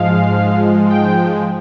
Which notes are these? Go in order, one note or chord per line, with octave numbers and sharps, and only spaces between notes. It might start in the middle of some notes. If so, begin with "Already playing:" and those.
Already playing: G#2 F3 G#3 F5
G5